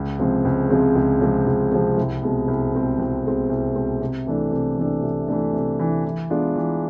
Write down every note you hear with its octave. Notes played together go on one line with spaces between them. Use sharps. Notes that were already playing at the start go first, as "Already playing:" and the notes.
Already playing: C#2
C3 F3 G#3 C4
C#2
C3 F3 G#3 C4
C#2
C3 F3 G#3 C4
C#2
C3 F3 G#3 C4
C2
B2 G#3 C4
C2
B2 G#3 C4
C2
B2 G#3 C4
C2
B2 G#3 C4
C3
E3 A3 D4
C3
E3 A3 D4
C3
E3 A3 D4
C3
E3 A3 D4
E3
G#3 B3 D4 F4
E3